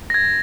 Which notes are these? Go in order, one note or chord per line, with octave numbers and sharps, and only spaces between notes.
A#6
G#6